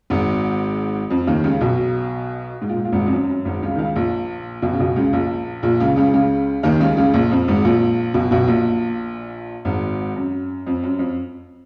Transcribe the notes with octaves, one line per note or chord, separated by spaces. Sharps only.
G#1 G#2
F2
D#2 D#3
C#2 C#3
B1 B2
G#2
A#2
G#2
A#2
G#1 G#2
F2
F#2
F#2
G#1 G#2
C#2 C#3
D#3
C#2 C#3
A#1 A#2
B1 B2
C#3
B1 B2
C#2 C#3
A#1 A#2
A#1 A#2
C#2 C#3
C#2 C#3
C#2 C#3
D#2 D#3
C#2 C#3
C#2 C#3
A#1 A#2
F2
G#1 G#2
A#1 A#2
B1 B2
B1 B2
A#1 A#2
G#1 G#2
F#2
F2
F#2
F2